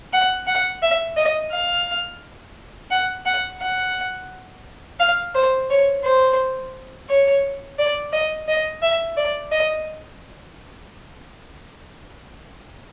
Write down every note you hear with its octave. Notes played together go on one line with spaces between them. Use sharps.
F#5
F#5
E5
D#5
F5
F#5
F#5
F#5
F5
C5
C#5
C5
C#5
D5
D#5
D#5
E5
D5
D#5